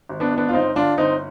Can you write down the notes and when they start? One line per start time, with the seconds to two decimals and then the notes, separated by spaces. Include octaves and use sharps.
0.09 G#1
0.20 B3 D4
0.32 G#1
0.38 B3 D4
0.49 F4
0.53 G1 C4 D#4
0.76 D3 D4 F4
0.98 G1 C4 D#4